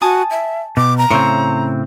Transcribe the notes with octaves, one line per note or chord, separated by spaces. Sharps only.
F#4 G#5 A5 D#6
E5
B2 D6
A#5
A2 C#3 C4 C#5 E5 C6